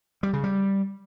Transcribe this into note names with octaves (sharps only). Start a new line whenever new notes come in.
G3
C#3
G3